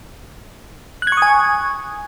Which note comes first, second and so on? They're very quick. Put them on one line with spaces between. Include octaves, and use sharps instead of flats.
F#6 G#6 C#6 D#6 G#5